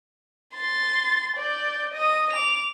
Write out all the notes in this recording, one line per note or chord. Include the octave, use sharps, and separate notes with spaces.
C6 A6
D5 G6
D#5 D#6
D6 F7